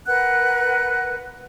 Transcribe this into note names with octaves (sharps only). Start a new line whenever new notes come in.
A#4 B4 F#5 F#6